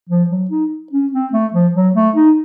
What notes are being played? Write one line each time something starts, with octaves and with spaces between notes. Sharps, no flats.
F3
F#3
D#4
C#4
C4
A3
F3
F#3
A3
D#4